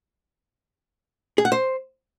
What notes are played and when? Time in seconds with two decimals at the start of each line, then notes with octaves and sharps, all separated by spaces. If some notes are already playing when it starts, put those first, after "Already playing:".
1.38 G#4
1.45 F#5
1.52 C5